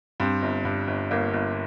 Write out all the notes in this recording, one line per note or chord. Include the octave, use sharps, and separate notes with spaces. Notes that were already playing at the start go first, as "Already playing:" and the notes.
G2 C4
G1
G2
G1
G1 A#3
G1